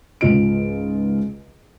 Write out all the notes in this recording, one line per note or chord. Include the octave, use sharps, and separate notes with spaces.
C#2 G#2 F4 D#5 D7